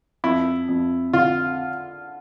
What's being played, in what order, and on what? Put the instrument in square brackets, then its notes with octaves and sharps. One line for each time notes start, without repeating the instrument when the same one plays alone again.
[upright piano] F2 [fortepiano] E4
[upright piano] F2
[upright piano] D3 [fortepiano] F4